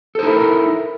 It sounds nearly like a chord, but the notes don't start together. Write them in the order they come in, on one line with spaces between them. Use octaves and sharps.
A4 C5 D#4 E4 A#4